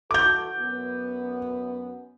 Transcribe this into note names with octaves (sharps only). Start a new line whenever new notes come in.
E3 F#4 A4 D6 G6
F#2 B3